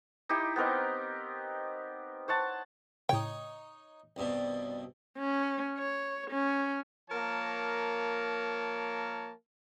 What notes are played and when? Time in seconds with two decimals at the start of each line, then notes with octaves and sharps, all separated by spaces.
0.29 D#4 E4 G4
0.56 B3 C4 A#4 D#5
2.28 C5 C#5 F#5 A5
3.09 A2 C#3 D#4 C#5 G5
4.16 C2 G2 B2 D5
5.19 C#4
5.78 C#5
6.31 C#4
7.10 F3 A#3 A#4 C#5 A5